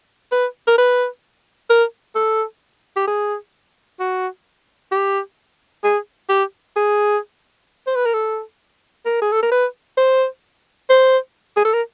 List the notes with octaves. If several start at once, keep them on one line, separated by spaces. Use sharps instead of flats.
B4
A#4
B4
A#4
A4
G4
G#4
F#4
G4
G#4
G4
G#4
C5
B4
A#4
A4
A#4
G#4
A4
A#4
B4
C5
C5
G#4
A4
A#4